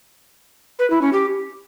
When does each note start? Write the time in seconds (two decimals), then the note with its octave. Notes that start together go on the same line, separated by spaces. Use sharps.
0.79 B4
0.90 E4
1.02 C#4
1.13 G4